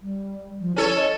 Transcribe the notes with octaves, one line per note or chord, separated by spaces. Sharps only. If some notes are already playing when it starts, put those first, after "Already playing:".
G3
F3
C#4 E4 A4 C#5
D#5